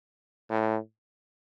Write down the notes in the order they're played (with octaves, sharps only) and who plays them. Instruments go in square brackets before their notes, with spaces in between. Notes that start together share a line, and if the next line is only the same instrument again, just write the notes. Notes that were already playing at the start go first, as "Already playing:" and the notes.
[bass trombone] A2